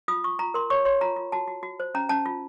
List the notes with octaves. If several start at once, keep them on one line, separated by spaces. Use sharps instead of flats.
F4 D#6
F4 C#6
F4 A#5
A#4 C6
C#5 C#6
C#5 C6
F4 A#5
F4
F#4 A5
F#4
F#4
C5
C#4 A#5
C#4 A5
F4